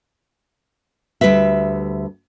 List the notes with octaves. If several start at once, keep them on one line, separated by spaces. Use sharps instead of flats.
D2 A#2 G3 B4 E5